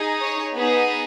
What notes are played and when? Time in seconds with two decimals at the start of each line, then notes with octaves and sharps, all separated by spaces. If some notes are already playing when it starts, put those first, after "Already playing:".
Already playing: D#4 G#4
0.20 C#5
0.56 B3 D#4 G#4